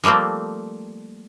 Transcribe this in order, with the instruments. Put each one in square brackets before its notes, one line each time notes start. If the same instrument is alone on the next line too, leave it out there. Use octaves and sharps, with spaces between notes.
[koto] F3 G3 A3 A#3 C4